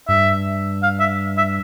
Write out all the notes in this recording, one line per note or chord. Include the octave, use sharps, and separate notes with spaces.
G2 E5
F5
E5
E5